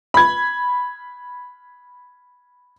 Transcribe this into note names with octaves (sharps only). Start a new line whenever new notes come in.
B5 G#6